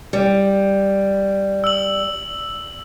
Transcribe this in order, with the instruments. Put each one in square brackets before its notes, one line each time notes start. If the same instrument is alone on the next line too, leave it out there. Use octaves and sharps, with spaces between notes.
[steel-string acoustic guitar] G3
[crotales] E6 F#7